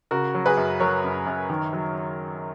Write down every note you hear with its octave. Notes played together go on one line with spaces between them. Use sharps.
C#3 F#4 A#4
F#3
G#4 B4
F#2
F#3 A#4 C#5
F#2
F#2
D#3
F#3